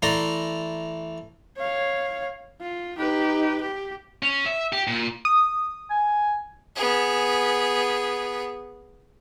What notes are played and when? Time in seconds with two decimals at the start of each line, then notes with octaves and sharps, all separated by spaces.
0.02 E3 A3 D5 A#5 C6
1.57 C#5 F5
2.61 F4
2.98 D#4 G4 B4
3.61 G4
4.23 C#4
4.46 E5
4.73 G4
4.88 A#2
5.25 D#6
5.90 G#5
6.76 B3 G#4